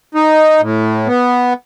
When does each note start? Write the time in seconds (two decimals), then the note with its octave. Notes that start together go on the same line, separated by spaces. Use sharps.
0.15 D#4
0.61 A2
1.07 B3